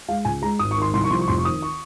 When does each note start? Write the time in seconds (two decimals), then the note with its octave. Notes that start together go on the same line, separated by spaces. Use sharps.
0.09 G#3 F5
0.25 C#2 G#5
0.42 G#3 A#5
0.59 G#1 D#6
0.71 C#6
0.77 D#3 C6
0.93 C2 C6
1.04 C#6
1.11 F3 C6
1.21 C#6
1.28 F1 C6
1.38 C#6
1.45 D#3 D#6
1.62 C#6